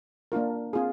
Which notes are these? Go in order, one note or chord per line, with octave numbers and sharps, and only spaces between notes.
A#3 D4 F4 A#4
C4 F4 G#4